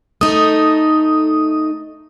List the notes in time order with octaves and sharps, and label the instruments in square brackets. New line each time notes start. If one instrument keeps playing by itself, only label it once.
[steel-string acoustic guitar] A3 D#4 [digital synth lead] D#6